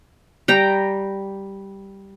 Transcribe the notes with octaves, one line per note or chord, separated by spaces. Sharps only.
G3 G5 A#5